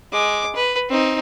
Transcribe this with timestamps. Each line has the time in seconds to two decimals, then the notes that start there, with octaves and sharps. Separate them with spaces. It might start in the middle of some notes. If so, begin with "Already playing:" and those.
0.12 G#3 D6
0.55 B4
0.89 C4 D#4